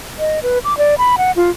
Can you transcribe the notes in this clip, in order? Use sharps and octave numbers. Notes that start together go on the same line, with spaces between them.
D#5
B4
D6
D5
B5
F#5
F4